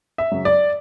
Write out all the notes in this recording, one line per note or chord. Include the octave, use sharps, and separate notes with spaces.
E5
F#2 C#3 F#3
D5